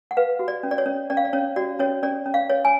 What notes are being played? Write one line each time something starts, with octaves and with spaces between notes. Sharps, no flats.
F#5
B4 F5
F#4
D5
C#4
D5
C#5
C#4
C#4 D5
F5
D5
C#4 C#5
F#4 D5
C#4 C#5
C#4 D5
C#4
F5
C#5
G#5